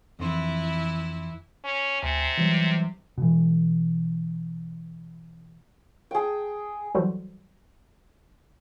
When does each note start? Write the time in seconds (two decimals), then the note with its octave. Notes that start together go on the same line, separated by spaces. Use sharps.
0.19 F2 E3 E4 C6
1.65 C#4
2.02 D2 C3 G#5
2.38 E3 F#3 G3
3.18 B2 E3
6.11 G#4 G5
6.95 E3 F#3 G3 F#4 A4 C5